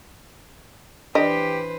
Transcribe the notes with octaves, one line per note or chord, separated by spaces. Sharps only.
E3 D4 G4 B4 C5 D5 D#5